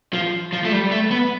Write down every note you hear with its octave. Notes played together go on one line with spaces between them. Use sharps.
F3
F3
A3
G3
A3
B3